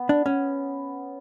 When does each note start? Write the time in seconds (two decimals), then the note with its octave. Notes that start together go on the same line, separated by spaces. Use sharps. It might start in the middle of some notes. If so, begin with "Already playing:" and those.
Already playing: B3
0.09 D4
0.26 C#4